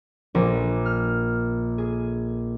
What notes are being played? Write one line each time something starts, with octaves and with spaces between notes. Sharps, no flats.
A#1
F6
G#4